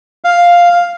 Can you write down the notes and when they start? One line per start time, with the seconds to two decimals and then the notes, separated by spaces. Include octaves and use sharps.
0.24 F5